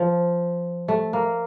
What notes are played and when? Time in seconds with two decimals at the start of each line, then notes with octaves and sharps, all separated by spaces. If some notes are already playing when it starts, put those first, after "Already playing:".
Already playing: F3
0.88 A3
1.13 A#3